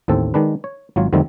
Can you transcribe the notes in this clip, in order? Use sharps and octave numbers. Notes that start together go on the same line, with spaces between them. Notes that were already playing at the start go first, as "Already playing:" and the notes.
A1 D#2 A2 C4 A4
D#3 G#3 D4 B4
C#5
G#1 F#3 F4 C#5
F2 D3 D#3 G3 A3 C4